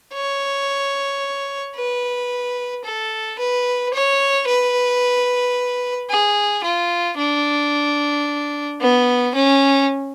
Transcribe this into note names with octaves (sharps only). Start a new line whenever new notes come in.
C#5
B4
A4
B4
C#5
B4
G#4
F4
D4
B3
C#4